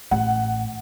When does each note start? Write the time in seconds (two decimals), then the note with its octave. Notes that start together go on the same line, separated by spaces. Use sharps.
0.11 A1 F#5